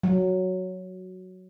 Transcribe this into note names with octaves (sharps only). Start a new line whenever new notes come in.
F#3